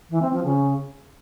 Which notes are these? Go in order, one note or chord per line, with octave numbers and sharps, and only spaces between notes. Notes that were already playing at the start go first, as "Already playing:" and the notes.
E3
C4
F3
C#3